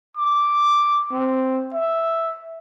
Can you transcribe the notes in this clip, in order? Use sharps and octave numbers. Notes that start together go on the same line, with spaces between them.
D6
C4
E5